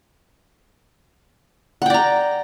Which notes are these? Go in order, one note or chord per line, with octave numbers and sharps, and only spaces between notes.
D5 F#5 G5 A#5